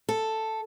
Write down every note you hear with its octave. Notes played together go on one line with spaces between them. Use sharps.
A4